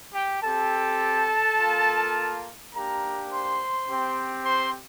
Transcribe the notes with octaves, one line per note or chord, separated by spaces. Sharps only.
G4 G5
C4 G4 A4 A5
F4
A#3
A#3 D4 G4 A#4 A#5
C5 C6
C4 G4
C5 C6